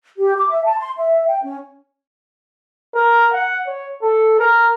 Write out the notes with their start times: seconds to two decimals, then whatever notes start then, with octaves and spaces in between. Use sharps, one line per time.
0.18 G4
0.38 D6
0.50 E5
0.65 A5
0.78 C6
0.98 E5
1.27 G5
1.44 C#4
2.95 A#4
3.33 F#5
3.67 C#5
4.02 A4
4.39 A#4